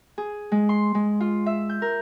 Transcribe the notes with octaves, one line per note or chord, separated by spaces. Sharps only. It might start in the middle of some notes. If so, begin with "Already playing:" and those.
G#4
G#3
C6
G#3
F4
E5
G6
A#4